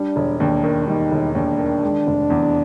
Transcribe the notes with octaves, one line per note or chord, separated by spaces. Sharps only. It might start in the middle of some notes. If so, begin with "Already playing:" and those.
Already playing: G3 D4
E1
D#2 D4
D#3
G3 D#4
E1
D#2 D4
D#3
G#3
F1
E2